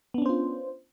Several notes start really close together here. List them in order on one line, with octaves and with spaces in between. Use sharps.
B3 D4 C#4 C5 F4